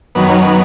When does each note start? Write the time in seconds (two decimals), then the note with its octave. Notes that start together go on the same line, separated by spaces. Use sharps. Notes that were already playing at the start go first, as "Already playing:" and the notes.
0.15 F#2 D#3 F#3 B3
0.29 C#4
0.43 B3